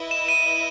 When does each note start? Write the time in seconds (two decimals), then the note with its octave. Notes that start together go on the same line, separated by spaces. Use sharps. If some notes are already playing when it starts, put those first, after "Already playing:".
Already playing: E4 B4 D#5
0.11 E7
0.28 D#7